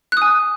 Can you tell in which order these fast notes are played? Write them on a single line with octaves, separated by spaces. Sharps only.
F#6 D#6 G#5